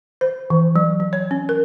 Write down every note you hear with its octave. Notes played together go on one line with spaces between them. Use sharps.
C5
E3
F#3
F#3
C#5
C#4
A#4